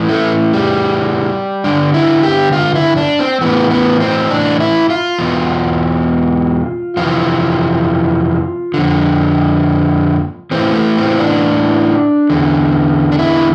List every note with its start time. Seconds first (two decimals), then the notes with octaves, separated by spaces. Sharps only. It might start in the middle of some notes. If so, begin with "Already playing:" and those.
Already playing: A2 E3
0.09 A3
0.53 G3
1.64 G2 D3 D4
1.94 E4
2.23 G4
2.53 F4
2.75 E4
2.97 D4
3.19 C4
3.41 A2 E3 B3
3.71 B3
4.00 C4
4.31 D4
4.60 E4
4.90 F4
5.19 E2 B2
6.97 F2 C3 E3 F4
8.74 F2 D3
10.51 A2 E3 C4
10.74 A3
10.97 C4
11.19 D4
12.30 E2 D3
13.12 D4
13.19 E4